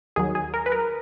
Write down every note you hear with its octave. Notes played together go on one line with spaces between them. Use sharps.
D#2 D#3 F#3 G#4
G#4
A#4
B4
A#4